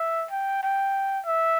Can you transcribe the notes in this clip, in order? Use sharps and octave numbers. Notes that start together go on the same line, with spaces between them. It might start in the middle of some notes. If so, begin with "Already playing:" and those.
Already playing: E5
G5
G5
E5